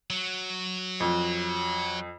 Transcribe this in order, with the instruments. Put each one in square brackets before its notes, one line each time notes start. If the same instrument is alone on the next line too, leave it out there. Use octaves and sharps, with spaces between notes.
[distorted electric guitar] F#3
[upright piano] F2